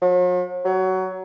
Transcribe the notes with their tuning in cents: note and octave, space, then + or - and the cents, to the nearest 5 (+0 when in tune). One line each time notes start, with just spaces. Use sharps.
F#3 -45
F#3 +20